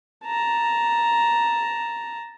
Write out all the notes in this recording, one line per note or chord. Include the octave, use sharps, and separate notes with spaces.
A5 A#5